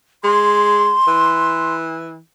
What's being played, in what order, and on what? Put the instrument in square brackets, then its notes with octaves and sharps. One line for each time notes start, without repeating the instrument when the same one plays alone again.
[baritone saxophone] G#3 [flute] C6
[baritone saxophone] E3